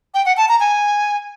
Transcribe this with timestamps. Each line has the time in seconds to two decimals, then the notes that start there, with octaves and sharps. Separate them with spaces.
0.14 G5
0.26 F#5
0.37 A5
0.49 A#5
0.60 G#5